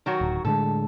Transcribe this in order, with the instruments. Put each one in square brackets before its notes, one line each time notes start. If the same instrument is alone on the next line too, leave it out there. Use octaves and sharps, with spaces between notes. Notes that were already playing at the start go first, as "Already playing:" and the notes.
[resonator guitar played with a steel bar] D#3 F#3 F#4
[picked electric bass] D1
[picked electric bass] A2 D3 G#3 [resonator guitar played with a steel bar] A4